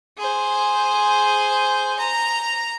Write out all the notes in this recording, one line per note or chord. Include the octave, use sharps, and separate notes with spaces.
G#4 C5
A#5